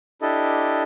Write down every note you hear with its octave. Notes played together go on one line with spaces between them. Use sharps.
D4 E4 G4 A4 D#5